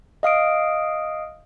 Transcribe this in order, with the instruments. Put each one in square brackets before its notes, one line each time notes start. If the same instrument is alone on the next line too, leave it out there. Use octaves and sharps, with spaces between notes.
[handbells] D#5 F5 D#6 D7